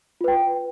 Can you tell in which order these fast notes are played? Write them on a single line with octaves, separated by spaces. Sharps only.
F4 B4 G5